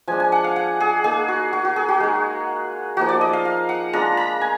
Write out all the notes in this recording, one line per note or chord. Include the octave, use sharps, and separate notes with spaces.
F3 G#3 D4 G#5
G#5
F#5
F5
F#5
G#4
A#3 D#4 G#4
F#4
F#4
F#4
G#4
F#4
G#3 D#4
F3 A#3 D#4 F#4
D5
D#5
F5
F5
F#5
G#3 D4 F4 A#5
A#5
G#5